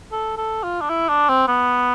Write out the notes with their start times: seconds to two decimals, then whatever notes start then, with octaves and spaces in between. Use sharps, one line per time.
0.12 A4
0.37 A4
0.64 F4
0.81 D4
0.90 E4
1.09 D4
1.29 C4
1.48 B3